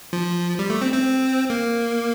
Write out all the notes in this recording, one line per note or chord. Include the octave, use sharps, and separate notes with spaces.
F3
G3
A3
C4
C4
A#3